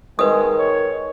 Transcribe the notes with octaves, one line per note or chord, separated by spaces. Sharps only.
D#3 G#3 B4 D#6
C#5